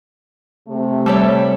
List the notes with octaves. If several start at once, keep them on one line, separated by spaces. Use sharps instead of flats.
C3 A3
G3 A4 C#5 D5 E5